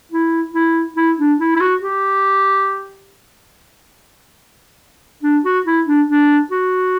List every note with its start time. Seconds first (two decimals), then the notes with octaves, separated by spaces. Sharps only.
0.12 E4
0.54 E4
0.97 E4
1.18 D4
1.40 E4
1.56 E4
1.60 F#4
1.82 G4
5.23 D4
5.45 F#4
5.66 E4
5.87 D4
6.08 D4
6.51 F#4